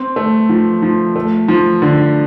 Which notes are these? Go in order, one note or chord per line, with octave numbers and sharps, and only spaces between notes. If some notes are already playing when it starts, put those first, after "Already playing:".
Already playing: C4
A3
F3
F3
A3
F3
D3